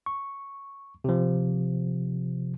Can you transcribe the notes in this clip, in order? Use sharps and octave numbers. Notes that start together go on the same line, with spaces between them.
C#6
C3 F3